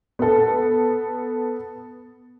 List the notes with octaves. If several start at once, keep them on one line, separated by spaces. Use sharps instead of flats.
B3 A4